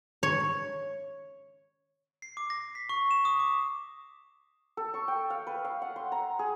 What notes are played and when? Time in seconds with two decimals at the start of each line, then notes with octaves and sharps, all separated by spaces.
0.23 C#5
2.22 C7
2.37 D6
2.50 A#6
2.75 B6
2.89 C#6
3.11 E7
3.25 D#6
3.40 D6
4.77 A4
4.94 C#6
5.08 G5
5.30 F5
5.47 B4
5.65 F5
5.82 F#5
5.96 C6
6.12 A#5
6.39 G#4